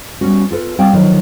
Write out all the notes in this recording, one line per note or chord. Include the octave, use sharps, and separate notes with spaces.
G3 B3 C#4 F#4
F4 A4 B4
G3 C4 F#4 F5 G5
D3 D#3 F3 F#3